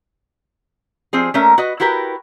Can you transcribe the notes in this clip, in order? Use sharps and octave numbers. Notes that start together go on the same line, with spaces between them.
F3 C4 G#4
A3 A#3 C#4 A#4 E5
F#4 B4 D#5
E4 F#4 G4 A#4 B4